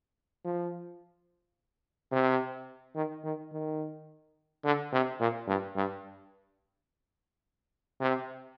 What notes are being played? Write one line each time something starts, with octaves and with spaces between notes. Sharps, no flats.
F3
C3
D#3
D#3
D#3
D3
C3
A#2
G2
G2
C3